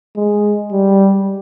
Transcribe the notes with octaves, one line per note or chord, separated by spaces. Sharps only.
G#3
G3